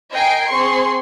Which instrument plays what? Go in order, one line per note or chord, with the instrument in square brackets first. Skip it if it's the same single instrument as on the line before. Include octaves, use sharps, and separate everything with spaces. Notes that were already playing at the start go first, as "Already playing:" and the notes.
[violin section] A#4 D#5 G5 G#5 C7 D7
C4 G#4 C6 C#6 C#7